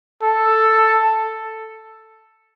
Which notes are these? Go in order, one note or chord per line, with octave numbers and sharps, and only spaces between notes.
A4